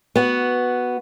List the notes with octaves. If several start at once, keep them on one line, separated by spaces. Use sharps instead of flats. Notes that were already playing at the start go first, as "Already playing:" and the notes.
B3 F#4